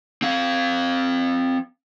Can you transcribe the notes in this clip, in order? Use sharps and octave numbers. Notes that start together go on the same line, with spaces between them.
C4 F5